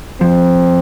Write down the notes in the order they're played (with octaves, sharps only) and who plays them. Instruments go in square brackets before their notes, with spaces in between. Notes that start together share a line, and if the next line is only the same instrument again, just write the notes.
[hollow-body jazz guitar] F3 [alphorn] C4